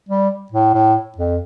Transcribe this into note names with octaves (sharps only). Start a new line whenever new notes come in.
G3
A2
A2
F2